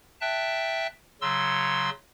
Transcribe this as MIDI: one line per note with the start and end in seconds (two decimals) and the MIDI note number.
0.21 0.87 76
0.21 0.87 79
0.21 0.87 81
0.21 0.87 90
1.21 1.90 49
1.21 1.90 54
1.21 1.90 84
1.21 1.90 88